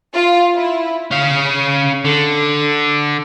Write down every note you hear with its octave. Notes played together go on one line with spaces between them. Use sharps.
F4
E4
C#4 F5
D3